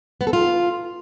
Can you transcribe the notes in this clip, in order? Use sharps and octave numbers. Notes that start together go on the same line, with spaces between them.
B3
A4
F4